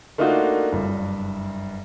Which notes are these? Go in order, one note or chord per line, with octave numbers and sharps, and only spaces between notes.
A3 A#3 D4 D#4 F4 F#4
F#1 G2